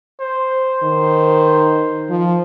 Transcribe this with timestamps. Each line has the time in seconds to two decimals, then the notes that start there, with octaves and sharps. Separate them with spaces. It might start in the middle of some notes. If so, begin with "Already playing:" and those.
0.21 C5
0.83 D#3
2.10 F3